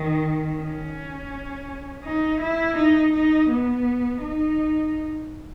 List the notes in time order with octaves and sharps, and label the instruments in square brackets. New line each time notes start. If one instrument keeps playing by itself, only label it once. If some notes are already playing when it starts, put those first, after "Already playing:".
Already playing: [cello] D#3
C#4
D#4
E4
D#4
D#4
B3
D#4